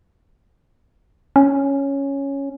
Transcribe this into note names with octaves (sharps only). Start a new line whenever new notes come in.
C#4